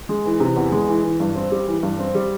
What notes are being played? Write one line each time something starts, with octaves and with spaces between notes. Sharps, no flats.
G#3
E3
C3
E2
G#3
E3
E3
G2
C4
G3
E3
G2
C4
G3